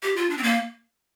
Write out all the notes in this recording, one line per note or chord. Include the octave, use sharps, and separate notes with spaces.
G4
F4
D4
C4
A#3